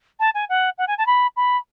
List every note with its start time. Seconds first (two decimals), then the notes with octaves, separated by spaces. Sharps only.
0.20 A5
0.34 G#5
0.49 F#5
0.78 F#5
0.87 G#5
0.98 A5
1.06 B5
1.36 B5